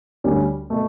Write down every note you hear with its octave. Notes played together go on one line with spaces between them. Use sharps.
D2 D3 G3 C#4
B2 A3